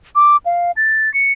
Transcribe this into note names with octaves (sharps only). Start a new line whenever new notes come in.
D6
F5
A6
C#7